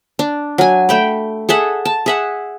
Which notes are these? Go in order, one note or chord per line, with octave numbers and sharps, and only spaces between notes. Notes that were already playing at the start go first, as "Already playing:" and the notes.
D4
F#3 G#5
A3 G5 B5
G#4 A4 E5 F#5
A5
G#4 E5 F#5